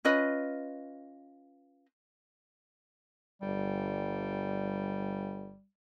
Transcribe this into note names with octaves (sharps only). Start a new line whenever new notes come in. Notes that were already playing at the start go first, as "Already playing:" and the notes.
C#4 F4 B4 D#5
G1 G3